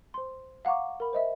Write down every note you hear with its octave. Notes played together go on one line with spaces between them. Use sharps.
C5 C6
F5 F#5 A#5 C#6 D6
A#4 B5
C5 D#5 E5